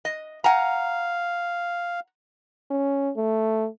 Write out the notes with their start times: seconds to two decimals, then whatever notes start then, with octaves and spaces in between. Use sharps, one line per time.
0.05 D#5
0.44 F5 F#5 G#5 A#5
2.70 C#4
3.17 A3